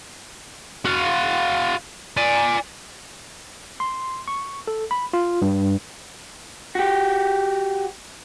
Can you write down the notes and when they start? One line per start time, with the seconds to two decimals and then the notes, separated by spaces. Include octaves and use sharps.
0.85 F#4 F5
2.17 D5 G#5
3.80 C6
4.28 C#6
4.67 A4
4.91 B5
5.13 F4
5.42 G2
6.75 F#4 G4